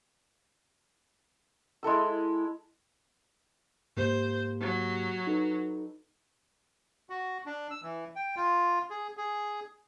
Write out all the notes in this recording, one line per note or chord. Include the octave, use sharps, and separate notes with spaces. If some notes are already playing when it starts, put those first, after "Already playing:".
G#3 E4 A4 E6
G#2 A#3 G4 C5
F#3
D#4 A4 B4
F#4
D4
E6
E3
G5
F4
G#4
G#4